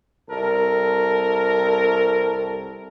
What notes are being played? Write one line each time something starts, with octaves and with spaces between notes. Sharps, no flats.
C2 A4 A#4